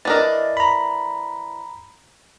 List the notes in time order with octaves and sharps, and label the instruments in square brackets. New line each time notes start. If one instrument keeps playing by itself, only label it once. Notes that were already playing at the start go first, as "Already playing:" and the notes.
[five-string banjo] E3 D4 A#4 [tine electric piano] D#5 A6
[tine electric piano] A#5 B5